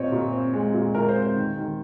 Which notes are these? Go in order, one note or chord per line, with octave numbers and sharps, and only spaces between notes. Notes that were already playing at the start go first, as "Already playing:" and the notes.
Already playing: A#2 C4 C#5 D#5
A#2
C4
G#3
A#2
A#2 A#4
C5
C4
C5
D#3
D#3